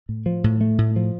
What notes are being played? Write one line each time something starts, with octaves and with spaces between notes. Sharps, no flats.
A2
F3
A2
A3
A2
F3